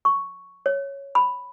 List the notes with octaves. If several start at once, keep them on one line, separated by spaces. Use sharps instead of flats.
C#6
C#5
B5